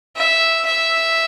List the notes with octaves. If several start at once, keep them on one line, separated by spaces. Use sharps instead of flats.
E5
E5